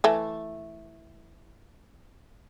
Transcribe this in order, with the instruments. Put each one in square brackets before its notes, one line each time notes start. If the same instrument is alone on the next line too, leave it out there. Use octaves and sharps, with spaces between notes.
[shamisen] E3 A3